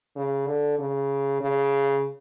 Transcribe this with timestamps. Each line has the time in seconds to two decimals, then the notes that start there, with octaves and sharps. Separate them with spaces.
0.16 C#3
0.47 D3
0.79 C#3
1.41 C#3